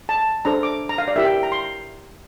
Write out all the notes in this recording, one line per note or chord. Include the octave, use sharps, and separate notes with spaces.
A5
D4 A4 C5 A#5
D6
A#5
F5
D5
E4 G4 A#4 E5
G5
A#5
C6